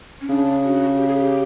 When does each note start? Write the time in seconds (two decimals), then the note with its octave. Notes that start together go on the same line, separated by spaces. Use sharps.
0.21 C#4
0.29 C#3 D4
0.64 F#4
0.97 G4
1.08 G#4
1.18 G4